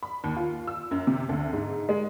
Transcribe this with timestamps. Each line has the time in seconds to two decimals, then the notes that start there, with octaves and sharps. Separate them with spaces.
0.03 B5
0.24 D#2
0.36 F4
0.67 E6
0.91 F#2
1.07 C3
1.29 D2
1.53 G#2
1.89 G#3